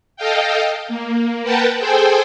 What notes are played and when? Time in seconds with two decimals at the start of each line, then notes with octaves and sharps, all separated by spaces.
0.17 A4 D#5 F5 G5
0.88 A#3
1.43 A#4 B4 F#5 G5 A5
1.79 G#4 A4 C5 G5 G#5